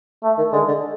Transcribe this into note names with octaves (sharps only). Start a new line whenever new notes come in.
A3
D#3
D3 G#3
D3